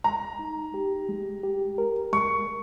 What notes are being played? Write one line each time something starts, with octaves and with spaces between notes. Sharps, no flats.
G#3 A#5
D#4
G4
G#3
G4
A#4
G#3 C#6
A#4